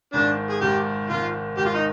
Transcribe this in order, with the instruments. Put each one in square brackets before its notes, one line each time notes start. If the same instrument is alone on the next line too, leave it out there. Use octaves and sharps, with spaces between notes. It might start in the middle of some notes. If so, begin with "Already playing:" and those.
[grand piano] G#1 G#2 D#3 [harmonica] D4
[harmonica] G#4
[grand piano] G#1 G#2 D#3 [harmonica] G4
[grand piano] G#1 G#2 D#3 [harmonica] F4
[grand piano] G#1 G#2 D#3 [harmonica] G4
[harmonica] F4
D#4